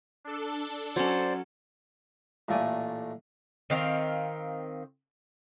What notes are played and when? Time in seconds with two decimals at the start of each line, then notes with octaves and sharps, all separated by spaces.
0.24 D4 A4
0.96 F#3 C#4 C5 D5
2.48 A1 A#2 A3 D5 G#5
3.70 D#3 C4 F5